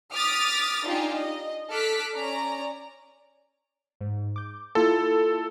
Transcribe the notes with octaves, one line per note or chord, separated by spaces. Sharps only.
D6 D#6 F6 A6 B6
D4 D#4 F4 G4 G#5
D#5
A4 D6 F6 F#6 B6
C#4 D5 A#5
G#2
D6 G6
A#3 E4 F4 A4